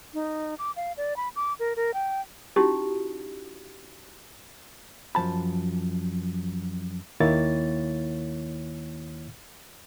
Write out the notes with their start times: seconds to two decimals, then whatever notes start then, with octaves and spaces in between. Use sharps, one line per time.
0.14 D#4
0.58 D6
0.76 F5
0.97 D5
1.17 B5
1.36 D6
1.60 A#4
1.76 A#4
1.94 G5
2.56 C#4 D#4 E4 F#4 G4
5.15 F#2 F3 A5 B5
7.20 D#2 D#3 A#3 E4 C#5 A6